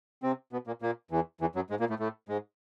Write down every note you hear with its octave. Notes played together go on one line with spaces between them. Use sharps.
C3 C4
B2 B3
A#2 A#3
A#2 A#3
E2 E3
E2 E3
F#2 F#3
G#2 G#3
A#2 A#3
A2 A3
A2 A3
G#2 G#3